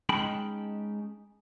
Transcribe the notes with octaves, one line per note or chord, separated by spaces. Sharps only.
G#3 C#4 D#4 G5 A5 B5